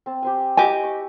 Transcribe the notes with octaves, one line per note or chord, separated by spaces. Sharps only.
C4 A5
G4 C5 G#5
E4 G4 D#5 G#5
C#6